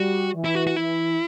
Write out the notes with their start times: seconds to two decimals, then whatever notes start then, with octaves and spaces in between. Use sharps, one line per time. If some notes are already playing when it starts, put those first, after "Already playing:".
Already playing: G3 F#4
0.33 E3
0.44 E4
0.55 F#4
0.67 F#4
0.76 E3 E4